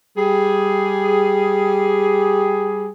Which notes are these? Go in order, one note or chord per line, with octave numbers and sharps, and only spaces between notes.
G3 G4 G#4